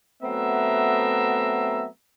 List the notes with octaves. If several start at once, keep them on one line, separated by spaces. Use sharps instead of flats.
F#3 A3 B3 C4 E5 A#5